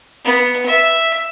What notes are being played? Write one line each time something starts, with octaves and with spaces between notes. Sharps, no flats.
B3
E5